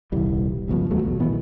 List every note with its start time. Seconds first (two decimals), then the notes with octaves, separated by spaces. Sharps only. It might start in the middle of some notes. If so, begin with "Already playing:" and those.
0.12 D#1 C2 E3 G3
0.68 G1 C#2 B2 F3
0.91 D#2 F3 F#3 A3
1.03 A#1 E2
1.20 A#2 D#3 E3 B3